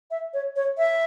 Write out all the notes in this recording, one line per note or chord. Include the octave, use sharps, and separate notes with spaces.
E5
C#5
C#5
E5